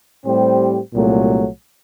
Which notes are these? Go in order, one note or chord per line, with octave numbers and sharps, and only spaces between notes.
A2 G3 C4 G4 C5
C2 A#2 F#3 A3